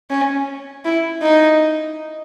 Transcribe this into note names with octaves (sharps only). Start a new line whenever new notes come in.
C#4
E4
D#4